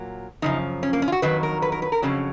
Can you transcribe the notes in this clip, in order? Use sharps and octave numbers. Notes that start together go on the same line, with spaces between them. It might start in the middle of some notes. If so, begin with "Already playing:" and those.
Already playing: A#2 F#3
F#2 C#3 F3 D#4
C#4
A#3
C#4
F4
F#4
F2 D#3 F#3 B4
A#4
B4
A#4
B4
A#4
F2 C#3 F#3 C#4